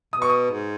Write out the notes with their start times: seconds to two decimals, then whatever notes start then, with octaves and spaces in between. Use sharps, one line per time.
0.13 B2 D#6
0.22 C#6
0.29 D#6
0.51 G#2